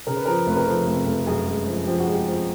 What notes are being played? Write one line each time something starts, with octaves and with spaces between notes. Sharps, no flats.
C#3 A#4
B4
F3 A#4
F1 B4
A#4
F3 A4
F1
F1
F#2 G#4
G#3
F3
F3 G4
F#4
G#3
G4
F3